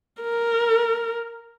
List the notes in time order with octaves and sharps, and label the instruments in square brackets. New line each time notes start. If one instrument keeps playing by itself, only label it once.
[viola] A#4